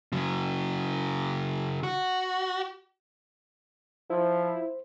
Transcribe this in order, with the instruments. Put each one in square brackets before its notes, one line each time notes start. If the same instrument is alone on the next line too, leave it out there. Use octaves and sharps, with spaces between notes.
[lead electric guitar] C#3 F#3
F#4
[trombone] F3 [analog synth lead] E4 [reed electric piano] C5